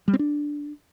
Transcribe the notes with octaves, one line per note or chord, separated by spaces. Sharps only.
G3
C4
D4